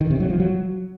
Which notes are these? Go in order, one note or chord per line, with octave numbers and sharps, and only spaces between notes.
D#3
C3
F#3
F3
F#3